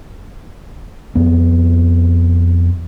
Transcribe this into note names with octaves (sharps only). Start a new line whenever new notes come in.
F2 B3